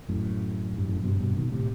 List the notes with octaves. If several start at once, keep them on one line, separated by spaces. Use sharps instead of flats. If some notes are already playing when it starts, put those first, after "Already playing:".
F#2 A2
G2
F#2 A2
G2 B2
C3
G2 B2
B2 D#3
A2 C3